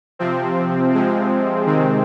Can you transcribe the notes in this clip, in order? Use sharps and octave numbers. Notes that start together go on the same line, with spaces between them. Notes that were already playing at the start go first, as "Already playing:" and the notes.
C3 F3 C4
C3 F3 G#3 C4
C3 D#3 G#3 C4